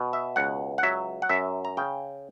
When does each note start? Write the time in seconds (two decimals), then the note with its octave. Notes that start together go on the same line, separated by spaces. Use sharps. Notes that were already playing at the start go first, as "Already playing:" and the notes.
Already playing: B2
0.13 E5
0.36 C#2 F#5
0.78 F#5
0.83 F#3 E5
1.22 F#5
1.29 F#2 E5
1.65 A#5
1.77 C#3 G5